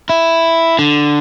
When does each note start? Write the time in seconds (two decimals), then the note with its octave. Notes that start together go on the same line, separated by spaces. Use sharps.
0.09 E4
0.79 D3